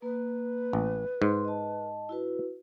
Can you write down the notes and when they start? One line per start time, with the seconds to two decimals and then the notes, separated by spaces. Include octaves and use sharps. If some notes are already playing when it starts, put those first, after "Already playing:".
0.02 A#3 B4
0.73 A1
1.22 G#2 C6
1.45 D#5 A5
2.09 E4 F#4 B4